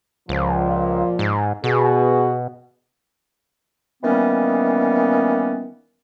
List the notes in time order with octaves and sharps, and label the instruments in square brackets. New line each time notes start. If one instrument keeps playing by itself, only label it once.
[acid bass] C#2 [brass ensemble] A#2 F3
[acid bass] G#2
[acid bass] B2 [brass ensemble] B3 F#4 G#4
[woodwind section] D#3 E3 G3 A#3 B3 C#4